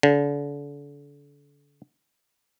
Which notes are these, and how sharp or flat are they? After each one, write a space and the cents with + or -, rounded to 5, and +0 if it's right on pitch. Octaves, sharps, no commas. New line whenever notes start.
D3 -35